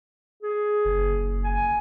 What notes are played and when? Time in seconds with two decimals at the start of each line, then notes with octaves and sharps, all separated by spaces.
0.43 G#4
0.85 F#1
1.44 G#5